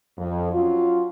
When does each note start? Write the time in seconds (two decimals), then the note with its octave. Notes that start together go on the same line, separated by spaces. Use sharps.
0.18 F2
0.53 F#3 C#4 F4